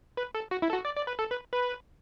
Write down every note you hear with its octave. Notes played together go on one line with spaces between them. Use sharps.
B4
A4
F#4
E4
A4
F#4
D5
D5
B4
A4
B4
B4